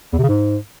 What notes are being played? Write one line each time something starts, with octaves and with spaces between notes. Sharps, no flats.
E2
C3
C#3
G#2